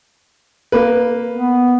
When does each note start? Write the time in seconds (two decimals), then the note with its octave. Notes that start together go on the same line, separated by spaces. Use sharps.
0.72 A#3 B4
1.33 B3